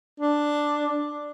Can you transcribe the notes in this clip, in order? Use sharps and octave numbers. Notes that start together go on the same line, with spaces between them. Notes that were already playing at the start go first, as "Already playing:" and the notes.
D4